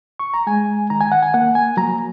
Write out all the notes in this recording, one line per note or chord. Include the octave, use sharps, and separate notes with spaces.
C#6
A#5
G#3 G#5
D#3 A#5
G#5
F#5
G#5
A#3 F#5
G#5
F#3 A#5